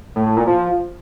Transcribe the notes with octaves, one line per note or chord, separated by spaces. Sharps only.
A2
A2
A#2
F3